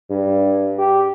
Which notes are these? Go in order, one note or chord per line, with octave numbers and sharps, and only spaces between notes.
G2
G4